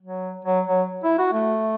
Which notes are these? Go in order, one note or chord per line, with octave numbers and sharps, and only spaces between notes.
F#3
F#3
F#3
E4
F#4
A3